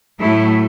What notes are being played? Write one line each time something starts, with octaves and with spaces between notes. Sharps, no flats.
A2 F#3 A3 E4